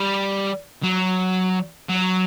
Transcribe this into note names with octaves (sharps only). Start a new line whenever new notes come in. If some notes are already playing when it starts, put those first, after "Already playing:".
Already playing: G3
F#3
F#3